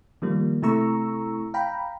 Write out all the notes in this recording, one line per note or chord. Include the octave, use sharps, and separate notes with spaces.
D#3 F3 G3 A#3
C3 A3 E4 A#5 C#6 E6
F5 G5 A#5 B5